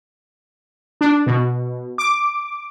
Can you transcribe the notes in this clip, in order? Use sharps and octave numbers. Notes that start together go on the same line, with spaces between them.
D4
B2
D6